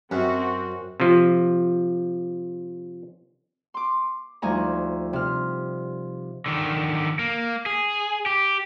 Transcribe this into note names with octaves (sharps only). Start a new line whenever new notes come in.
F#2 C4 F#4
C3 F3
C6 D6
D2 F3 G3 D#4 G#5 A#5
C3 F6
D3 D#3
A#3
G#4
G4